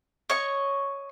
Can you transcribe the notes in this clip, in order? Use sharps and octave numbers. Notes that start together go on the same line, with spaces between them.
C#5 D#5 C#6